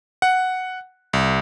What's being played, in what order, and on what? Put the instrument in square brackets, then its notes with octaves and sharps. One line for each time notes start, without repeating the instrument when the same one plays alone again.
[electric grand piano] F#5
C2